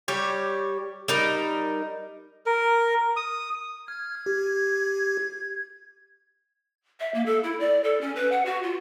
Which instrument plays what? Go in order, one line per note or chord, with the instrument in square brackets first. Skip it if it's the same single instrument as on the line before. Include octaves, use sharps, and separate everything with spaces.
[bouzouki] G3 G4 C#5
G3 D#4 A#4
[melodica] A#4
D#6
[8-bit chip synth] F6 [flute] G#6
[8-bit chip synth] G4
[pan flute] E5
A#3
A4
E4
D5
A4
C#4
B4
F#5
F#4
F4